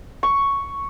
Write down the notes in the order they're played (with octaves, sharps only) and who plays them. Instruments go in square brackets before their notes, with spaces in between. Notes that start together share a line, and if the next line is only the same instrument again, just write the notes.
[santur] C#6